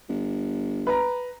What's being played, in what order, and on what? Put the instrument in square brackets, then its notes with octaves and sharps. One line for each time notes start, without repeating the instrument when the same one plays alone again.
[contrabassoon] G1
[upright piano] B4 A#5